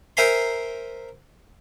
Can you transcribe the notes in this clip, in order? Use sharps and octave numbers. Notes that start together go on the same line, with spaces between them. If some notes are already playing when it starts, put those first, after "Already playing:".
A#4 C5 E5 G#5 A#5 C6